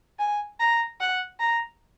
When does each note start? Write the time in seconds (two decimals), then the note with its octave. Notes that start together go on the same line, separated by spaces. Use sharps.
0.19 G#5
0.60 A#5
1.00 F#5
1.40 A#5